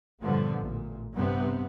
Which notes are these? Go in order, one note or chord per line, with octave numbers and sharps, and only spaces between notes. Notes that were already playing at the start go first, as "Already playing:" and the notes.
G2 A#2 D3 F3 B3
A1 A#2
G2 C3 B3